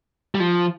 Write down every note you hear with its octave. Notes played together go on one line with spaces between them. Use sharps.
G3
F3